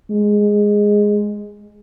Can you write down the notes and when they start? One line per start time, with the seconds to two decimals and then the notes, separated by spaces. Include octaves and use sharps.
0.11 G#3